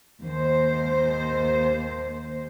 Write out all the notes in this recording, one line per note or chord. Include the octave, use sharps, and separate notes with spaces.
D#2 A#3 C5